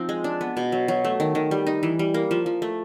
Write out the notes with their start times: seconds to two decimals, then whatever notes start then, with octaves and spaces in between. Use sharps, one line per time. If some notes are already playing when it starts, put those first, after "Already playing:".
Already playing: F3 C4 D#4
0.09 G#3
0.24 D4
0.41 B3
0.57 B2
0.72 F#3
0.88 F#3
1.04 A3
1.20 D#3
1.35 D#3
1.51 G3
1.67 D#4
1.83 E3
1.99 G3
2.14 A#3
2.31 F3
2.46 F3
2.62 A3